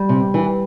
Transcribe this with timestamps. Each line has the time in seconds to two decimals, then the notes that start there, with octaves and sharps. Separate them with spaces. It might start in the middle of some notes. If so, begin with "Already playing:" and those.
Already playing: G3
0.09 C3
0.34 E3